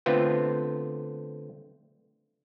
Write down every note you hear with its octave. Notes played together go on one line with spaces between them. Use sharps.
D3 A3 B3 C4 F4 B4